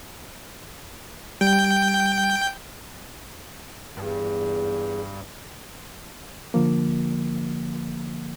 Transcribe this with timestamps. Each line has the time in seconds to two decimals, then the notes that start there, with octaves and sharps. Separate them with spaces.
1.41 G3 G5 G6
3.97 E2 G2
6.54 D3 F3 A#3